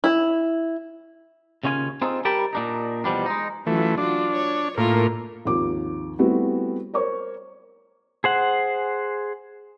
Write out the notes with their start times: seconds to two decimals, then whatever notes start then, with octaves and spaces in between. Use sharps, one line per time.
0.04 E4
1.64 D#2 C#3 C#4 F4 G#5
2.02 C4 D#4 F4 G#4 A4
2.25 G3 G4 A#4 G5 A5 B5
2.53 A#2 D4 D#4
3.04 E2 B2 F3 G3 D4
3.26 G#3 D#4
3.67 E3 F#3 A3 C#4 F4
3.98 D4 F4 F#4
4.32 C#5
4.78 A2 A#3 F4 A#4
5.45 G#1 D#2 F3 D6
6.19 G3 A3 B3 C4 E4 F#4
6.94 A#4 C5 C#5 C#6
8.24 G#4 C5 F#5